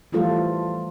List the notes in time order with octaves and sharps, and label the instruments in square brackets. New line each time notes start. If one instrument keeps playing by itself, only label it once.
[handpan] E3 F3 G3 A3 F4 A4